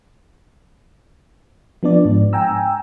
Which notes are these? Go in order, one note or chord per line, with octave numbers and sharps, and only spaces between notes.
F3 B3 D4 D5
G#2
G5 G#5 A#5 E6